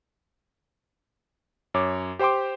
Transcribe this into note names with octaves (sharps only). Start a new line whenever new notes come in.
F#2 C#5 D6
G4 C5 G5 C6 D6